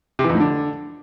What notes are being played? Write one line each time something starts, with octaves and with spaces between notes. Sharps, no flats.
C3
E3
F2
A2
D3